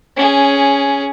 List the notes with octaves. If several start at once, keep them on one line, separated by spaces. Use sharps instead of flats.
C#4 G#4